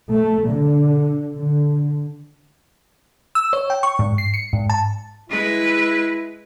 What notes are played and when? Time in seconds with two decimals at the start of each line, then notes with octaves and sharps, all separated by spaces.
0.14 A3
0.49 D3
1.36 D3
3.35 E6
3.53 C#5
3.70 G5
3.83 C#6
3.99 G#2
4.18 C7
4.34 C#7
4.53 G#2
4.70 A5
5.30 G#3 E4 B4